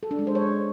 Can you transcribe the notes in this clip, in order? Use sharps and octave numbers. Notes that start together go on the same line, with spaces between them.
A4
D4
G#3
C5
C#5